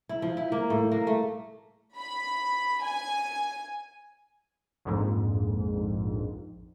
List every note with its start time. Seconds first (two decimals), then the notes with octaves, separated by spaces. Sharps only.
0.09 E4
0.22 F3
0.37 E4
0.52 A#3
0.70 A2
0.92 A#3
1.07 A3
1.98 B5
2.83 G#5
4.85 A#1 F2 G#2